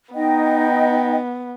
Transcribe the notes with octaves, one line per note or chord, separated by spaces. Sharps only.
B3 D#4 D#5 G5